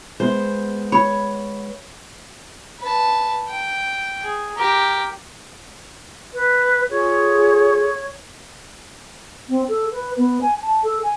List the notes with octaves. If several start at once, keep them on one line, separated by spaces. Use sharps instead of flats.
G#3 B3 C5
C#5 B5
B4 A5
G5
G#4
G4 A#4
B4
F4 G#4 A4 C#5
C4
A4
B4
B3
G#5
A5
A4
G#5